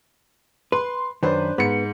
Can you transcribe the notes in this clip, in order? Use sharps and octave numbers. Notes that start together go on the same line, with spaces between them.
B4 C6
F#2 D#3 D4 B4 C5
G#2 B3 C#7